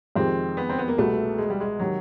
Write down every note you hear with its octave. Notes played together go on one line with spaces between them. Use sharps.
F2 C3 D#3 G#3 C4
B3
C4
B3
A#3
C2 B2 G#3 A3 B3
G#3
G3
G#3
C3 D#3 F#3